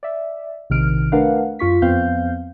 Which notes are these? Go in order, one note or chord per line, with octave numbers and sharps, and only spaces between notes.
D5 E5
A#1 C3 D#3 F6 D7
A3 D4 A#4 B4 F5 F#5
F#2 F4 C#6 B6
F2 B3 C4 F5 G6